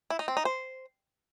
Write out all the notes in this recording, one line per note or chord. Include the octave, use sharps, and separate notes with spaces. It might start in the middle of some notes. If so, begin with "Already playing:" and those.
E4
D#4
C4
D#4
C5